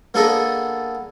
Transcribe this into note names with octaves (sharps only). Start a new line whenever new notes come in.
A#3 B3 D4 G#4 A4 D#5